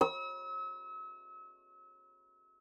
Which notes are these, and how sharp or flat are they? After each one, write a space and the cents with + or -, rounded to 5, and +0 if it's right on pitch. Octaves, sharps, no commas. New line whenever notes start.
E6 -40